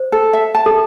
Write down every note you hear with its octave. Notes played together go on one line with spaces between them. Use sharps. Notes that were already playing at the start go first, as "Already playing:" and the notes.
Already playing: C5
A4
E5
A5
A4